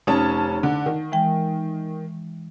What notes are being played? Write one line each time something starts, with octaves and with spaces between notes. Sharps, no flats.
F1 C#4 D#4 A5
D3
D#3
E3 G#3 G5